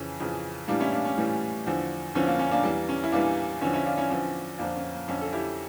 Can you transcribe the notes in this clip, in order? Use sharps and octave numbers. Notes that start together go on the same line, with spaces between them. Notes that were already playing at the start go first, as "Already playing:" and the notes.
Already playing: F2 C#3 E3 C#4
F2 C#3 E3
A2 E3 G3 A#3 D4
C#4 E4
A#3 D4
C#4
A2 E3 G3
E2 D3 F3
E2 D3 F3 C#4
A#3
C#4
A#3 D4
E2 E3 G3 A#3
C#4
E4
E2 E3 G3 A#3 D4
E2 D3 F3 C#4
C#4 E4
D4 F4
C#4 E4
E2 D3 F3 C#4
F2 D3 F3 A#3 D4
C#4
A#3
F2 D3 F3 C#4
A4
E4 G4